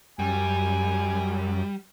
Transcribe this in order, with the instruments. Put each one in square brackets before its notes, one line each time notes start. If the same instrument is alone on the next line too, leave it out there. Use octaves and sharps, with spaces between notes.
[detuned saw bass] F#2 [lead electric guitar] G3 [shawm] G#5